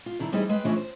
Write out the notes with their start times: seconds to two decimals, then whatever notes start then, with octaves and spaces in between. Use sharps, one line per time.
0.06 F4
0.19 G2 D#3 D4 E4
0.32 E3 G3 C4 D#4 E4 G#4
0.49 G#3 B4 F5 G5
0.65 C#3 E3 F3 A3 C#4 D4
0.76 C5